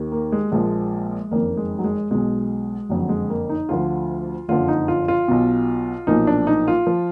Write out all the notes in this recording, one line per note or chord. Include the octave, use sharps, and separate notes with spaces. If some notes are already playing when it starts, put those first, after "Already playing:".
Already playing: D#2 D#3
A#3
G#3
A#1 A#2 F3 G#3
F#1 F2 D#3 A#3
G#3
F#3
G#3
B1 B2 G#3
F#1 F2 D3 F#3
G#3
A#3
D#4
D2 D3 F3 F4
F#1 F2 D3 F3 F4
D#4
F4
F4
B1 B2
B1 A#2 F3 D#4
D4
D#4
F4
F3